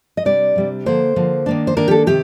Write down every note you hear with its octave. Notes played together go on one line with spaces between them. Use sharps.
D#5
C3 G3 D4 D5
C3 G3 D4
D3 F3 A#3 C5
D3 F3 A#3
D#3 A#3 D4
C5
D#3 A#3 D4 A#4
G4
A4
C3 D#3 G4